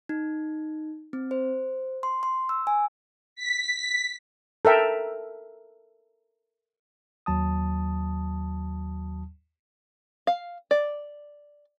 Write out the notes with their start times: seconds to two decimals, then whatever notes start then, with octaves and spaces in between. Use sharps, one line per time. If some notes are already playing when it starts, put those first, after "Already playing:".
0.09 D#4
1.13 C4
1.31 C5
2.03 C6
2.23 C6
2.49 E6
2.67 G#5
3.36 B6
4.65 A4 A#4 E5 G5
7.26 D#2 F#3 A5 D#6
10.27 F5
10.71 D5